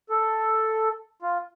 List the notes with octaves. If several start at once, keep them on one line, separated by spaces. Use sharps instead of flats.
A4
F4